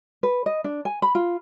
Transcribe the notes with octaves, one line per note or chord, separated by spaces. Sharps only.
B4
D#5
D4
G#5
B5
F4